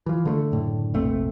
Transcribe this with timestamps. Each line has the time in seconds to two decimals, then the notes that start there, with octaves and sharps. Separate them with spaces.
0.06 E3 F3
0.25 D3 G#3 A3
0.52 F#1 A2 D3
0.94 F1 A#1 A3 C4